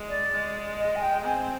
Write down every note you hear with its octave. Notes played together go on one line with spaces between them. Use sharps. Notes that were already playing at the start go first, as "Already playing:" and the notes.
Already playing: G#3
D5
G#3
D#5
G#5
G5
C4 G#5